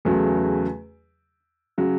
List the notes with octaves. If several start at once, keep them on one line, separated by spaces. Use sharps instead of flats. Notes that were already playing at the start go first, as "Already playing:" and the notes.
E2 C#3 F#3 A3
C#3 F#3